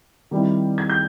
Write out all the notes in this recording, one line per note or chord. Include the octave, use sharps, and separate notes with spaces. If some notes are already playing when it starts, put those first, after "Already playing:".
D#3 G3 C4 E4
G#6
G6